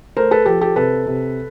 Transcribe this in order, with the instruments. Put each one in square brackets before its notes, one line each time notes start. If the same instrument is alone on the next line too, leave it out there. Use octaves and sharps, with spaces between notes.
[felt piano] A3 A#4 C5
A4 B4
F3 G4 A4
G4 A4
C3 A4 B4
C3